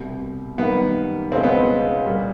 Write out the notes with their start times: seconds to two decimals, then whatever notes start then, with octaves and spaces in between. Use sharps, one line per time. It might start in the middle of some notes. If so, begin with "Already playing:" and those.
Already playing: C2 B2 G3
0.58 F#2 D#3 G3 A#3 B3
1.31 C#2 B2 G#3 C4 C#4
1.43 B3
2.05 A#2 G3